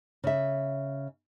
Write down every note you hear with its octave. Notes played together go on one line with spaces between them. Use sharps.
C#3 E5